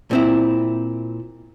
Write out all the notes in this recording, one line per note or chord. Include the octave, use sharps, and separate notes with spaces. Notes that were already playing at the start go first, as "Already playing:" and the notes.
A#2 C4 E4